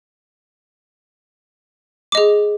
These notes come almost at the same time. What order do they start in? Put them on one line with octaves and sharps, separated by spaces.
D6 D#5 G#4